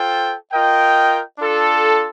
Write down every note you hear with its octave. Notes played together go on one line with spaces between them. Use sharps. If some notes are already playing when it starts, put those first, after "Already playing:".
Already playing: F4 A4 C5 G5
F4 A#4 D#5 G5
D4 F4 A4